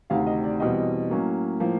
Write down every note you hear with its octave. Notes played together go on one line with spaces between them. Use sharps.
D2 C3 D#3 F5
D#5
D5
E2 B2 G3 C4 D#5
A2 F#3 A#3 C#4
A2 F3 A#3